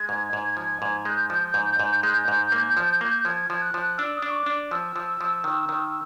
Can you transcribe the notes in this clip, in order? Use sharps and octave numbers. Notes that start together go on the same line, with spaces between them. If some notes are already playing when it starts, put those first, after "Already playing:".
Already playing: G#3 G#6
G#2
G#2
F3
G#2
G#3 G6
F3
G#2
G#2
G#3
G#2
A#3
F3
A#3
F3 G#6
F3
F#6
F3
D4 E6
D#6
D4
C#6
D6
D4
F3 E6
F3
F3
D#3
D#3